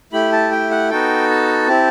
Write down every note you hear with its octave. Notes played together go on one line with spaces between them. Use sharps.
A3 E4 G4 B5
A5
G5
F#5
B3 D#4 F#4 A4 G5
A5
C4 E4 G4